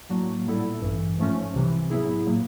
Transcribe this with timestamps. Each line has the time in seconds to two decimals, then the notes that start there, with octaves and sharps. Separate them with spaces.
0.09 A2 F#3 A#3 D4 F#4
0.46 A#2 G3 B3 E4 A4
0.82 A1 G2 E3
1.17 G#2 F3 A3 C#4
1.53 C2 C3 E3
1.90 A2 F#3 B3 E4 G#4
2.26 A#2 F#3 A#3